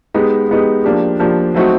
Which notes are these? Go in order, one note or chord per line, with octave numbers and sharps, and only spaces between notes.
G#3 B3 D#4 G4
G#3 B3 D#4 G4
F3 A#3 D4 G4
F3 A#3 D4 G4
F#3 A3 C4 D#4 F#4